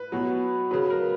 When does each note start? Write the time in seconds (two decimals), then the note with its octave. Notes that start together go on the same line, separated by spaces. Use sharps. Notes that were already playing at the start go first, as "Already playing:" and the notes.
Already playing: B4
0.12 B2 F#3
0.71 C#3 F#3 B4
0.90 A#4